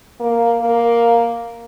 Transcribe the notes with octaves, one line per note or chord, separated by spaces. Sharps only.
A#3
A#3